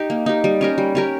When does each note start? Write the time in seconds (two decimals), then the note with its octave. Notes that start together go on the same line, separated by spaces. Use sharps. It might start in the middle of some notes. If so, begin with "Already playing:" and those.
Already playing: D#4 G4
0.10 A#3
0.26 D#4 G4
0.44 G3
0.61 C#4 G4 A#4
0.78 G3
0.95 C#4 G4 A#4